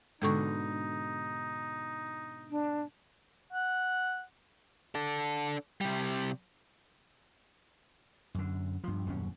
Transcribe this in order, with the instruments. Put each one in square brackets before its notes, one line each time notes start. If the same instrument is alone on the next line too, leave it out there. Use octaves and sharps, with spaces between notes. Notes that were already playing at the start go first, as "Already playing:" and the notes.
[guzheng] G#2 B2 D3 [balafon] G#3 A4 C#6 [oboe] D#4
[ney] D4
[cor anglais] F#5
[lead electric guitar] D4 A4
C3 G3
[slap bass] F#2 D3
G2 F3
D#1 F#2 B2 C#4